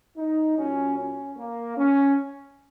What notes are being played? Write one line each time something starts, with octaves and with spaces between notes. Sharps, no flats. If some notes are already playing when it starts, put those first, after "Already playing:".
D#4
A#2 F#3 C#4
C#4
A#3
C#4